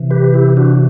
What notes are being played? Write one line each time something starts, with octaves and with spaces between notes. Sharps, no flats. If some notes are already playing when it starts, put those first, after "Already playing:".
Already playing: C3 E3
G4 B4
E4 G4
D4 F#4